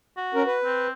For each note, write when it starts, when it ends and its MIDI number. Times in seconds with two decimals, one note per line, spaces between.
0.17 0.56 66
0.34 0.43 61
0.34 0.43 70
0.46 0.87 71
0.65 0.92 60